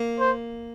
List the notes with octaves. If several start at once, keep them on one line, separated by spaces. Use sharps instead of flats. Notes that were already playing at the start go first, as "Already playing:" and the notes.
Already playing: A#3
C5